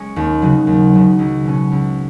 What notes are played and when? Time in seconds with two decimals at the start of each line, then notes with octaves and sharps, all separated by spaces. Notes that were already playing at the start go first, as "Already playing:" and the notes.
Already playing: G#3 C#4
0.16 D#2
0.42 C#3 F#3
0.67 D#2
0.93 C#3 F#3
1.19 C#2
1.45 B2 G#3 C#4
1.72 C#2